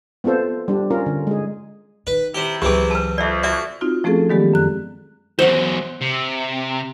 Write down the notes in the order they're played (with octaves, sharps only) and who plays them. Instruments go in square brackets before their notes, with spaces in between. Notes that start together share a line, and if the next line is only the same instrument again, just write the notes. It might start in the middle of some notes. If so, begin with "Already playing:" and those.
[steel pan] B3 C4 F4 A4 C5
G3 D4
C#4 F4 A#4
D3
G#3 G#4
[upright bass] D#3 [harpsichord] B4
[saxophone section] C3 E4 [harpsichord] G4 C5
[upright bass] C#2 F#3 [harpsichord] E3 C4 [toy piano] G4 G#4
[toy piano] B4 A5
[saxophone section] F2 [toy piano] D5 E5
[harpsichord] F#4 [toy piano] D5 E5
[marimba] C4 D#4 F4 F#4
F3 A3 C4 C#4 G#4 A4
D#3 F#3 G#3 B3 G4 D5
F#2 F#6
[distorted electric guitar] E2 F#3 [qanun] C5 F#5
[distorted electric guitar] C3